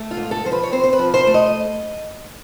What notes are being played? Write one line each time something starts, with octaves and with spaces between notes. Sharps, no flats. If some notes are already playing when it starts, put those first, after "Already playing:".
Already playing: A3
F4
G#2
A4
F3 C5
B4
C#5
C4 C5
C5
B4
F3
C5
A3
D#5